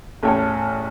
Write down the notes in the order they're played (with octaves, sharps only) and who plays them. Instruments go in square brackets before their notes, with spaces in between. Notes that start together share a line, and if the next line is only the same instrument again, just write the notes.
[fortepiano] A1 E2 A2 A4 C#5 G5